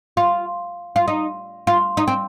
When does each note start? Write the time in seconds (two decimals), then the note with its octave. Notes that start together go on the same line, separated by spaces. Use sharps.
0.17 F4
0.96 F4
1.08 D#4
1.67 F4
1.97 D#4
2.08 C4